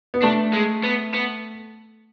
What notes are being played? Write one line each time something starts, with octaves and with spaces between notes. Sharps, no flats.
B3
A3 D4
G#3
B3
B3